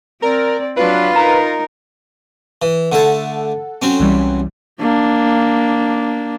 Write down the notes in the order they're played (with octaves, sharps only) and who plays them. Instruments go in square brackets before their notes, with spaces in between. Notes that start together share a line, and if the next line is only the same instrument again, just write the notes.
[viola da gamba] C4 [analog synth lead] A#4 [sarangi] D5
[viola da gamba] F#3 D4 [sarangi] F4 [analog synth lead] B4
[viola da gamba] D#4 A#4 [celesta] A#5
[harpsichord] E3
[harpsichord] D3 A3 A5 [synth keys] A4 F#5
[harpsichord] F#3 C4 C#4
[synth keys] C2 E3 G3
[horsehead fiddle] A#3 D4